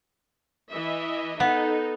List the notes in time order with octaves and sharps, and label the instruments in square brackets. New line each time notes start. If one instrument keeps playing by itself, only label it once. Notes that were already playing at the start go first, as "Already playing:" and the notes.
[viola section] E3 D#5 E5
[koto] B3 [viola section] D#4 A4